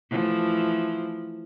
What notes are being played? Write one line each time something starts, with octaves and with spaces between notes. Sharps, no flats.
E3 F3 A3